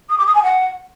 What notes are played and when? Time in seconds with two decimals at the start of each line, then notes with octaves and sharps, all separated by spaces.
0.09 D#6
0.18 D6
0.26 D#6
0.34 G#5
0.43 F#5